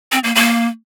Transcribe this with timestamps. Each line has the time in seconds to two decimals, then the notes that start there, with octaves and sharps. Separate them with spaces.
0.12 C4
0.24 A#3
0.35 A#3